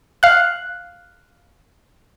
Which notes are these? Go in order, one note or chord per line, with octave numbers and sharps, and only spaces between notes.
F5 F#6